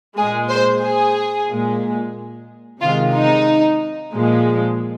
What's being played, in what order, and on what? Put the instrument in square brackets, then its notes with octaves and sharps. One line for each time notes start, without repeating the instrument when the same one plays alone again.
[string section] A#2 G#3 G#4
C5
G#4
A#2 G#3
C3 D#3 G#3 F4
D#4
A#2 F3 G#3